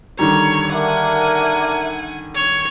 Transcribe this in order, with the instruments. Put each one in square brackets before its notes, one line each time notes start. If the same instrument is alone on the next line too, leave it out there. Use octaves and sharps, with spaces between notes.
[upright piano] D3 D#3 G3 [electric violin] C#5 [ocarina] A#5
[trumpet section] A#3 D4 A#4 [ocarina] E5 [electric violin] F#5 G#5
[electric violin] C#5